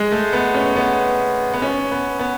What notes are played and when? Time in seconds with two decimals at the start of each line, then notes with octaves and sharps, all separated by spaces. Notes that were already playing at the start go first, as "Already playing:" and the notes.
Already playing: G#3
0.12 A3
0.33 B3
0.54 C#4
0.76 B3
1.54 B3
1.62 C#4
1.91 B3
2.19 B3